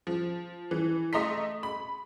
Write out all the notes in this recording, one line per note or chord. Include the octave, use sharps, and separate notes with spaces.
F3
E3
A3 D#5 A#5 C6 B6
B5